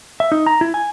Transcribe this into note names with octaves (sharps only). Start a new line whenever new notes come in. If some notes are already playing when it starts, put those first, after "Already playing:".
E5
D#4
A#5
E4
G#5